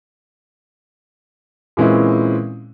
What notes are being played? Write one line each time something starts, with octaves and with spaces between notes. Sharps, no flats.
A#2 E3 G#3 C4 C#4 E4